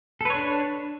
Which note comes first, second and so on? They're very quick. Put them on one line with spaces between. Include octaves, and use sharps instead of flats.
A4 B4 C#5 D4